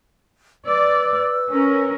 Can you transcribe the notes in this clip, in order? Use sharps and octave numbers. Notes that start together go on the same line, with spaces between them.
B4 D5 E6
C#4 A#4